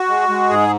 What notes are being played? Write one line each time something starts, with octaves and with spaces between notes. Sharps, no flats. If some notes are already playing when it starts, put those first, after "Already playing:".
Already playing: F#4
G#3
G#3
G#2 G#4